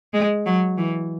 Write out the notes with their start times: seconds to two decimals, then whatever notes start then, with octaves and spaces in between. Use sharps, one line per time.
0.14 G#3
0.46 F#3
0.78 E3